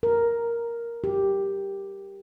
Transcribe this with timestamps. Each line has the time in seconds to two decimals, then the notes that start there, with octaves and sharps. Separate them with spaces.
0.03 A#4
1.04 G4